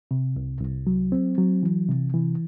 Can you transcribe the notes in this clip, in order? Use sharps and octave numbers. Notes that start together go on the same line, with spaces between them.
C3
C2
C2
F#3
C4
F#3
E3
C3
E3